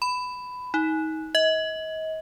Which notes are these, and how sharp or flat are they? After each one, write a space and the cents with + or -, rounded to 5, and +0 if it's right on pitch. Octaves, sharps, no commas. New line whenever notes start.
B5 +15
D#4 +30
D#5 +35